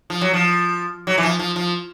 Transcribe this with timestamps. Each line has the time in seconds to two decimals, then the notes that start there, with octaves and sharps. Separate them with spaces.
0.10 F3
0.21 F#3
0.33 F3
1.07 F#3
1.18 E3
1.23 F3
1.39 F3
1.56 F3